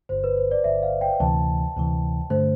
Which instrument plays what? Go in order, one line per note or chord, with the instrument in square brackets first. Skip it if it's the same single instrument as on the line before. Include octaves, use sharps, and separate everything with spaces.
[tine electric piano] G1 G2 D3 [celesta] C5
[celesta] B4
C5
D5
[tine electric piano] G1 G2 D3 [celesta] E5
[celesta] F5
G5
G5
[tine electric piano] D2 C3 E3 [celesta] A5
[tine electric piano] D2 C3 E3
[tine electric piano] G2 D3 A3 [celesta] C5